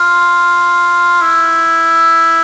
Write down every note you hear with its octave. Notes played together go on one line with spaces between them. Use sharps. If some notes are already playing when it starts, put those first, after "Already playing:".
Already playing: F4
E4